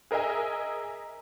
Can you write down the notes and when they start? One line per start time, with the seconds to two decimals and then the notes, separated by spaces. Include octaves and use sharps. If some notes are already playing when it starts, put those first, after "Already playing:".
0.11 G#4 A#4 D#5 E5 G#5